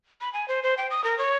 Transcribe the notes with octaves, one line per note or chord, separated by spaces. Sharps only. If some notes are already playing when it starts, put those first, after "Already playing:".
B5
G#5
C5
C5
G5
D#6
A#4
C#5